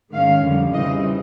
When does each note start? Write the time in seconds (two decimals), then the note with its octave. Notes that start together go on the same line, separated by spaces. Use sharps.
0.13 G#2 D#3 G#3 C#4 F5
0.43 F2 D3 G3
0.74 C#3 E3 G3 C4 D#4 D#5